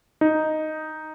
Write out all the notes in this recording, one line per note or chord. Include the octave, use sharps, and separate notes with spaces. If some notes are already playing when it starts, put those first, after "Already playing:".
D#4